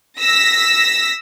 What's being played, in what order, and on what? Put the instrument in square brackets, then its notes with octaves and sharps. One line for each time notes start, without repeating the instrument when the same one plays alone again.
[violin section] E6 A#6 B6